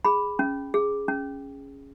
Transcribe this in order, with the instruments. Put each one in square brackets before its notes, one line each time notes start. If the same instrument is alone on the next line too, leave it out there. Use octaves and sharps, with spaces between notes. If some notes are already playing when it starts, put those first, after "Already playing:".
[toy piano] G#4 B5
C#4
G#4
C#4